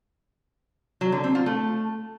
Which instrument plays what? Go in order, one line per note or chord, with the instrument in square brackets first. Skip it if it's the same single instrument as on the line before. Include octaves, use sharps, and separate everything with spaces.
[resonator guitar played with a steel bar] F#3
D3
C4
F4
A3